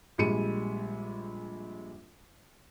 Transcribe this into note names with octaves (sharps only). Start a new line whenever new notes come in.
A#1 G3 G#3 C#7 D#7